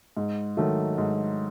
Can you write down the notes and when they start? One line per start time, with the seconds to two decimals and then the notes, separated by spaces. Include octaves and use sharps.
0.17 G#2
0.57 D#3 F#3 A3
0.98 G#2